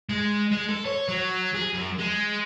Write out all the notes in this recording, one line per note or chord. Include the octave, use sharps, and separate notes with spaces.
G#3
G#3
A4
C#5
F#3
G#4
F#2
G#3